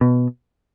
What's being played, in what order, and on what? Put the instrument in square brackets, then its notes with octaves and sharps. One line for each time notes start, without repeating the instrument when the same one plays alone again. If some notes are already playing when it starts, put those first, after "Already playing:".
[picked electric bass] B2